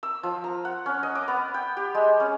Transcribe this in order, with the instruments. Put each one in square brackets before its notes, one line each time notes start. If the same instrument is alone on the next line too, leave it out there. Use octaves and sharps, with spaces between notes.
[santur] E6
F3
A#5
F#5
C#4
D#5
D6
B3
G5
G4
G#3
C#4